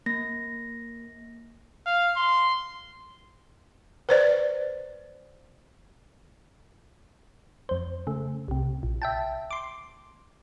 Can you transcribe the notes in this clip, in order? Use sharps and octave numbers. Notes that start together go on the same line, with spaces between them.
A#3 A#6
F5
C6
B4 C5 D5
F2 C5
C#3 A3
C2 C3
A#1
E5 G5 A5
C6 D6